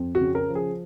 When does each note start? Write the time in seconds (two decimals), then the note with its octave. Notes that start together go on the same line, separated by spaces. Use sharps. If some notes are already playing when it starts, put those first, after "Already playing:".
Already playing: F2
0.15 F#4
0.21 C#3
0.35 A#4
0.48 F3
0.55 G#4